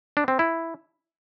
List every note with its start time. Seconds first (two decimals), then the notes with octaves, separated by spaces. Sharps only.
0.17 D4
0.28 C4
0.39 E4